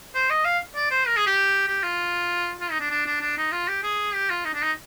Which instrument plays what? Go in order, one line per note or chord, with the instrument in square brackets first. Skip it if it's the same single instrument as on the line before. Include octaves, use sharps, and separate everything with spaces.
[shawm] C5
D#5
F5
D5
C5
A#4
G#4
G4
G4
F4
F4
D#4
D4
D4
D4
D4
D#4
F4
G4
G#4
G4
F4
D#4
D4
D#4